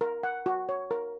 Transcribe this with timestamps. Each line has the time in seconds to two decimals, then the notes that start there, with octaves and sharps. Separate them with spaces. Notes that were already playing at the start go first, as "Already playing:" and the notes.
0.01 A#4
0.23 F#5
0.46 F#4
0.69 C#5
0.91 A#4